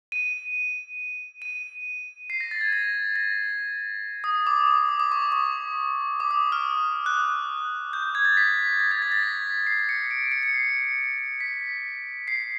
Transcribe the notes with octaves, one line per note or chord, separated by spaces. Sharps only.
D#7
D#7
C7
A#6
A6
G#6
A#6
A#6
D#6
D6
D6
D#6
D6
C#6
D6
C#6
D6
D#6
F6
F#6
G6
G#6
A6
B6
A#6
G#6
A6
A#6
B6
C7
C7
C#7
D7
C#7
C#7
C7
B6
C7